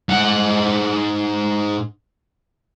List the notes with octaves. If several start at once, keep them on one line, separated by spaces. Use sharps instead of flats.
G#2 F#5